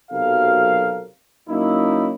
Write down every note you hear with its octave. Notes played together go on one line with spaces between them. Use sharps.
B1 C3 F#3 A4 A#4 F5
F#2 A#3 C#4 D#4 E4